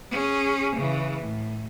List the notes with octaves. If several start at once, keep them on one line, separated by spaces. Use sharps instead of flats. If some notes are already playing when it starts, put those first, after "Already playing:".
C#4 G#4
C#3 E3
A2